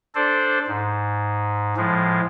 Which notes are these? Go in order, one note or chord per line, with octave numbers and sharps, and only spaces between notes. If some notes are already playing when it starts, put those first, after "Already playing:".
D4 A4 C5 D5
G#2
A2 F3 G#3